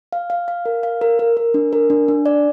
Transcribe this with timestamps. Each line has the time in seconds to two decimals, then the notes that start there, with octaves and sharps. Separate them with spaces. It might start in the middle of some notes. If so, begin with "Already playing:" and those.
0.13 F5
0.30 F5
0.48 F5
0.66 A#4
0.83 F5
1.01 A#4
1.19 A#4
1.37 A#4
1.54 D4
1.73 A#4
1.90 D4
2.08 D4
2.26 D5